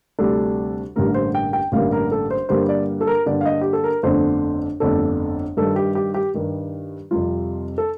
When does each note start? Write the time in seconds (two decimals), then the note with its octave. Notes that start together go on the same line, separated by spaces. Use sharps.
0.19 D2 C3 G3 D4 A4
0.96 A1 G2 D3 G3 A#3 A#4
1.15 C5
1.35 G5
1.53 G5
1.72 A1 G2 D3 G3 A#3 F5
1.92 A#4
2.12 A4
2.31 C5
2.49 G2 D3 G3 A#3 C5
2.69 D5
3.01 A4
3.07 A#4
3.26 G2 D3 G3 A#3 D5
3.41 F5
3.46 D#5
3.61 G4
3.73 A4
3.84 A#4
4.03 G1 F2 D3 A3 D4 C5
4.80 G1 F2 D3 A3 D4 A4
5.57 G2 D#3 G3 A4
5.76 G4
5.95 G4
6.14 G4
6.34 G2 D#3 G3
7.11 F2 C3 G3 F4
7.78 A4